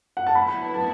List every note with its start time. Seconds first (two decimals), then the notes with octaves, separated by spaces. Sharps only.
0.17 F#5
0.27 A5
0.35 D3 F#3 B3 E4 B5
0.74 A5